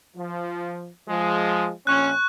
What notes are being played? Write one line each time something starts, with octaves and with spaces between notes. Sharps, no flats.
F3
F3 G#3
A#1 C#4 C#6 F#6